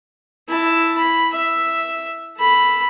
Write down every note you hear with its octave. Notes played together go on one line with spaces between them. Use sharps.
E4 A5
B5
E5
A4 B5